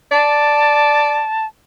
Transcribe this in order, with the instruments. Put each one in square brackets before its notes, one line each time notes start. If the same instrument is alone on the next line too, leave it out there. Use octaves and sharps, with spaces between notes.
[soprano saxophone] D5 [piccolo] A5